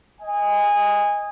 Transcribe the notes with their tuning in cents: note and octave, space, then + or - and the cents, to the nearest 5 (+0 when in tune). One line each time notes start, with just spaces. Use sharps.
D#5 +0 G#5 -20